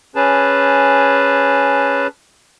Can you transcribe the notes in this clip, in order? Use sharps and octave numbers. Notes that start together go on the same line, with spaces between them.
C#4 G#4 B4 A5